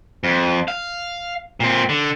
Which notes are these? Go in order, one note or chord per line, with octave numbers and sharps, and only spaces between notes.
F2
F5
A#2 C4
D3